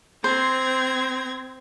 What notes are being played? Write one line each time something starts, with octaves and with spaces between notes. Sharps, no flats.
C4 C5 G#6 A#6